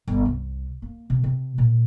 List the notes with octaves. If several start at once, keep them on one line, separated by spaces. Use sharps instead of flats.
G1
C2
A#3
C3
C3
A#2